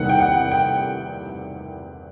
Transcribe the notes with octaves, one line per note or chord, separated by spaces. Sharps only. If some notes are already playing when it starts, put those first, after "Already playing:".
Already playing: E2 C3 D#3 G3 A#3 F#5
G5
F#5
G5